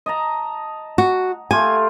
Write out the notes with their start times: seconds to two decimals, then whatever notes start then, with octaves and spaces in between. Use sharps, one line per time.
0.06 D#5 A5 A#5
0.98 F#4
1.51 A3 F4 G4 G#5